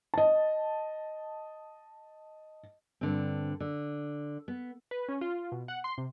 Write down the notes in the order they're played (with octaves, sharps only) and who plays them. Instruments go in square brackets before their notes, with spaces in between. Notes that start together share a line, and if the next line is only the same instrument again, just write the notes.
[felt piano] D#5 A5
[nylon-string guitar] G2 D3 C4
D3
B3
[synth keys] B4
C#4
F4
B2
F#5
C6
C3